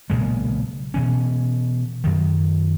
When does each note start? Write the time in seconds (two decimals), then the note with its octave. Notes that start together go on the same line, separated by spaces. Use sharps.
0.10 B1 A#2 C#3 G#3
0.94 B2 E3 C#4
2.04 F#2 D#3